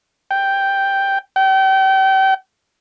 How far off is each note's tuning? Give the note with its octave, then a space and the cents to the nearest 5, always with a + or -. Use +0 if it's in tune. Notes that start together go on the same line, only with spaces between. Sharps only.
G5 +0
G5 -35